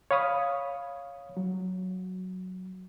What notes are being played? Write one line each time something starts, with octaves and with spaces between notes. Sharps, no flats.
C#5 F5 B5 D#6
F#3